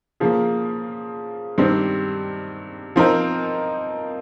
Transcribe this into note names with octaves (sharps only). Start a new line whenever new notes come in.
C#3 F3 A#3
G2 D#3 G3 C4
F3 C4 D#4 A#4